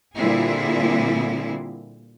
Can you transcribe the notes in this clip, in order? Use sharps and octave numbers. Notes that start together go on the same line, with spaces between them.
A#2 D3 G3 C4 E4 G#4